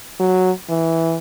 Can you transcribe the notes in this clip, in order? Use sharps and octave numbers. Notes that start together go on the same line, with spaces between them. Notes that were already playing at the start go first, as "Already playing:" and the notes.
F#3
E3